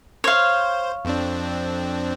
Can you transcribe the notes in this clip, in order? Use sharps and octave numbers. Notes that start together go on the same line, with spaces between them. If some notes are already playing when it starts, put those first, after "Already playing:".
C5 C#5 F5
F2 C4 D4